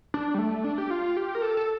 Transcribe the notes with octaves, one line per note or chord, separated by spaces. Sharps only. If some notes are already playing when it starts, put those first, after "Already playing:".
D4
G3
A3
D4
G4
F4
G4
A#4
A4
A4